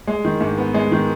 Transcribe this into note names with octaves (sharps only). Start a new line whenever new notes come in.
G#3
D#3
G#2
B3
G#3
D#3